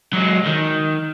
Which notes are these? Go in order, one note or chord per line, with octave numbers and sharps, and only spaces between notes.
F#3 G#3
D#3